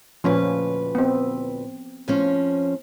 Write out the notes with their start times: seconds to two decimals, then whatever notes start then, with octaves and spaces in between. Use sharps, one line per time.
0.24 D2 A#2 F3 C#4 B4
0.95 B3 C4
2.08 F2 F3 C#4